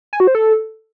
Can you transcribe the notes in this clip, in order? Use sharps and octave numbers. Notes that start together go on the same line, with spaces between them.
G#5
F#4
C5
A4